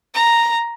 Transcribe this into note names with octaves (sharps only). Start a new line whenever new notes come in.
A#5